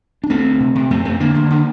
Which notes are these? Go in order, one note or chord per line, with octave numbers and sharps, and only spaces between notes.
D4
D2 A3 C4
D2
C3
C3
F2 A3 C4
F2 A3 C4
D3 A#3 D4
D3
D3